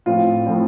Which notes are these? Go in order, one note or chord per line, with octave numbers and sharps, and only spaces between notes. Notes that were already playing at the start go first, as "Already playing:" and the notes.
A2 F3 C4 F4
A2 F3 C4